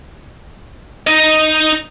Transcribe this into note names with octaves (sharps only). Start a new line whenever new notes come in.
D#4 D#5